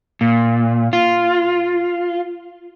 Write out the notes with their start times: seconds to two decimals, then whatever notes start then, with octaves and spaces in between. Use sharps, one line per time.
0.21 A#2
0.93 F4